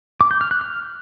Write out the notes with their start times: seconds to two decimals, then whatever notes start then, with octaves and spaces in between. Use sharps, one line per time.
0.21 D6
0.31 G6
0.41 F6
0.51 F#6
0.61 F6